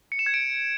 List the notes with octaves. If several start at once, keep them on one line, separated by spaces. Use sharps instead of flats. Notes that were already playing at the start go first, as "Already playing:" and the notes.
C#7
E7
G#6
D7